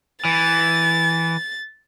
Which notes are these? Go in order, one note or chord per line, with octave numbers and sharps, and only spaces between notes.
E3 A6